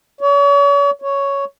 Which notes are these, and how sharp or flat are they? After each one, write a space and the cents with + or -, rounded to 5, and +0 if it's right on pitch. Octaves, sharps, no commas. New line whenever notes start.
C#5 +40
C#5 +5